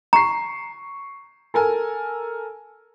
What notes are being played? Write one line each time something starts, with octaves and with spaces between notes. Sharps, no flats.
A#5 C#6 C7
A4 A#4 G#5